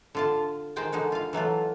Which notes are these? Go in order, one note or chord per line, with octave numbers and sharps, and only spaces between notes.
D3 F4 A5
D#3 G#3 C5 G5 A5
D3 G#3 D#4 F#4
F4 F5
E3 F#3 A3 F4